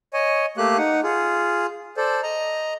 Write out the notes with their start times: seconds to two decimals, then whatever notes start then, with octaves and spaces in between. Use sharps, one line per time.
0.13 C#5 D#5 G#5
0.58 A3 A#3 G4 F#6
0.78 D#4 F#5
1.03 F4 G#4
1.97 A4 C5 D5
2.23 D#5 A#5